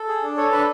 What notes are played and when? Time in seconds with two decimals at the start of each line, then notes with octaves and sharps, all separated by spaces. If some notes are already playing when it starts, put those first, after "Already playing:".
Already playing: A4
0.08 G#4
0.23 D4
0.37 A4 C#5
0.52 D4 B4